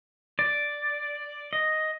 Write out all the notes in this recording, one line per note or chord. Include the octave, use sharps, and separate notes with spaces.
D5
D#5